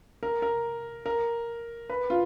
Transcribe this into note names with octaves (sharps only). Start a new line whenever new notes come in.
A#4
A#4
A#4
B4
F4